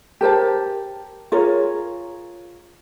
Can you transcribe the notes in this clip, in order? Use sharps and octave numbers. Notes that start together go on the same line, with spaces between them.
G4 A#4 C5 A5
F4 G#4 A#4 C#5